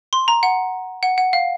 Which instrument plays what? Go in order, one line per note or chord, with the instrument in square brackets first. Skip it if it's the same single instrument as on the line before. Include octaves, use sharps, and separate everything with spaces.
[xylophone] C6
A#5
F#5
F#5
F#5
F5